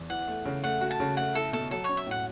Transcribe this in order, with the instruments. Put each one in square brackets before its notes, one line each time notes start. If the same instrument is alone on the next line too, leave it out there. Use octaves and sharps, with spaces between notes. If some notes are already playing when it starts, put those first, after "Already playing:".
Already playing: [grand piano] E2
[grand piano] E3 [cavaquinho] F#5
[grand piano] A3
C#3
[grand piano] A3 [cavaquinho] F#5
[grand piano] F#4
[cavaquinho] A5
[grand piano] C#3
[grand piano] A3 [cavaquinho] F#5
[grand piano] E4 [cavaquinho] A4
[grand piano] B2 [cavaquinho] A4
[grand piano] F#3 [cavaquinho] A4
[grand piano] C#4 [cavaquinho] C#5
[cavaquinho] E5
[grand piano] A2 [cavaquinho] F#5